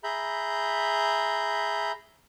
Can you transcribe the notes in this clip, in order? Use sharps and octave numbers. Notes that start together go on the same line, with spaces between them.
G#4 E5 A#5 B5 G6